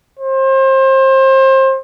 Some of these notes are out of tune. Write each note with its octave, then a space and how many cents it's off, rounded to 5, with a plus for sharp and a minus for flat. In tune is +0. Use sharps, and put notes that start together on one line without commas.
C5 +30